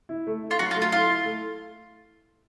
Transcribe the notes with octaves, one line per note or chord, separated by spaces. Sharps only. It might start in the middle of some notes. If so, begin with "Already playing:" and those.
E4
A3
E4
F4
F#3 F#4
F4
A3
F4
E4 F4
E4
A3